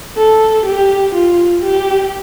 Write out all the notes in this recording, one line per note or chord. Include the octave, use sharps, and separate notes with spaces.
A4
G4
F4
G4